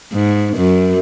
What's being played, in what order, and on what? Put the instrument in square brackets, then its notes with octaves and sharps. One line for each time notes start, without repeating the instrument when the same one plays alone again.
[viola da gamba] G#2
F#2